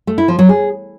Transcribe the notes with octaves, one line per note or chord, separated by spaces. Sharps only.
A3
E4
F3
F#3
G#4